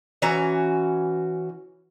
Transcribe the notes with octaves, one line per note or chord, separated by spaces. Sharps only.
E3 C#4 F#4 A#5